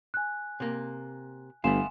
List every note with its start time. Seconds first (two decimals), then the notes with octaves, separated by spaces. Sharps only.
0.14 G#5 F#6
0.60 C3 A#3
1.64 G1 A3 B3 F5 G#5 C6 E7